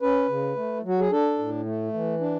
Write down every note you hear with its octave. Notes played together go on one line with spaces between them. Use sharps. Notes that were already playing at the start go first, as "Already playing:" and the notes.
C#4 B4
C#3
A3
F#3 F#4
G#4
D4 A4
A2
A3
E3
D4